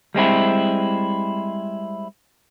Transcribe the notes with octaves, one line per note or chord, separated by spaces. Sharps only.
G3 G#3 C4 E4